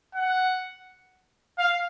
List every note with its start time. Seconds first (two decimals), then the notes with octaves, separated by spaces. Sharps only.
0.15 F#5
1.58 F5